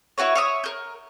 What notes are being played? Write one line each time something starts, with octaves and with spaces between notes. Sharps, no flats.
E4 F#4 B4 C#5
C#5 E5 D#6
A#4 G6